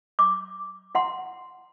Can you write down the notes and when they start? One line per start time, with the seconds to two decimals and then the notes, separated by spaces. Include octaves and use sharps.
0.19 D6
0.95 E4 F#5 C6